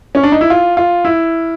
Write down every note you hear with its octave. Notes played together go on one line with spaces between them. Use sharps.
C#4
D4
D#4
E4
F4
F4
E4